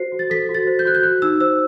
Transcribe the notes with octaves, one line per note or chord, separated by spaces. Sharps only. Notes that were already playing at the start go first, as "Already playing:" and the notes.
Already playing: F#4 A4 C5 C7
F#4
A6
A4 B6
F#4
A6
C5
G6
F#4 F#6
G6
F#4 F#6
D#4 E6
C5 E6